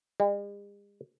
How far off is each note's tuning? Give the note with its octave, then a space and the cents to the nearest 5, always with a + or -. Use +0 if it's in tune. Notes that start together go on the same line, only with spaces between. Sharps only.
G#3 -45